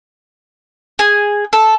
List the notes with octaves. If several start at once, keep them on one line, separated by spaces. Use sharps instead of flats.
G#4
A4